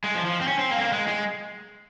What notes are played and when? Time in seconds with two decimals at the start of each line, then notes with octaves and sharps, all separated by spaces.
0.04 G#3
0.15 F3
0.25 F3
0.41 C4
0.48 C#4
0.59 C4
0.71 A#3
0.77 C4
0.81 A#3
0.92 G#3
1.07 G#3